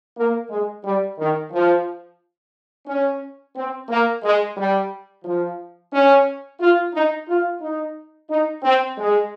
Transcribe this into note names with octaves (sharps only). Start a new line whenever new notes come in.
A#3
G#3
G3
D#3
F3
C#4
C4
A#3
G#3
G3
F3
C#4
F4
D#4
F4
D#4
D#4
C4
G#3